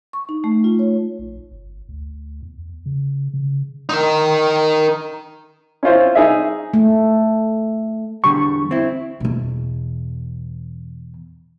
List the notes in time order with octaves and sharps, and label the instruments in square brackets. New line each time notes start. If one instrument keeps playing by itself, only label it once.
[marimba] C#6
D#4
A3
F4
C#5
[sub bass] A#1
G1
D2
E2
C#3
C#3
[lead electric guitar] D#4 A#4
[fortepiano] C#4 E4 F4 C5
D#4 G#4 E5
[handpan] A3
[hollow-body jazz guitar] E2 D3 G3 [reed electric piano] C#6
[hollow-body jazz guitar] C4 E4
[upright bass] E2 B2